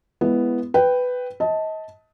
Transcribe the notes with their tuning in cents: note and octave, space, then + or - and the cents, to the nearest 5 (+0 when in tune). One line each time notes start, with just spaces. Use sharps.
G#3 +0 B3 +0 E4 +15
B4 +10 G5 +0
D#5 +30 A5 +0